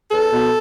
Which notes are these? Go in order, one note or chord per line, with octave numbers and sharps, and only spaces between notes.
E2 A4
B2